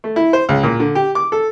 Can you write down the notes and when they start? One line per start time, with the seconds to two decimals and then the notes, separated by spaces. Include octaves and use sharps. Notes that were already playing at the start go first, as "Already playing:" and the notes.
0.04 A3
0.16 E4
0.33 C5
0.49 C#2
0.63 A#2
0.80 D3
0.95 G4
1.15 D6
1.32 A4